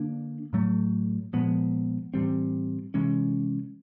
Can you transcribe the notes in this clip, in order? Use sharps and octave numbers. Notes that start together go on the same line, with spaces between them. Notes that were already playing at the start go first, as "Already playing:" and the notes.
Already playing: D3 A#3 D4
A2 F#3 A3
A#2 F3 G#3 B3
A2 E3 G3 C4
C3 E3 G#3 C#4